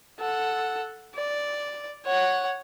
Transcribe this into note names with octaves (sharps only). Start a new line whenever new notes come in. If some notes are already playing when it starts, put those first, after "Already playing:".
A4 F#5
D5
C#5 F#5